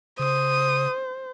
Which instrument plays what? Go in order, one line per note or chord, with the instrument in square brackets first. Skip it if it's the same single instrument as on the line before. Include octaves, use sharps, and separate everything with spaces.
[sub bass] C#3 [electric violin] C5 [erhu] D#6